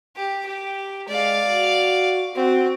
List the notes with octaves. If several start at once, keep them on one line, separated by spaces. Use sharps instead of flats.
G4
G4
G#3 D5 F5
F#4
C4 F#4